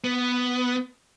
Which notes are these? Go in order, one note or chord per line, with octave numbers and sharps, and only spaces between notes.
B3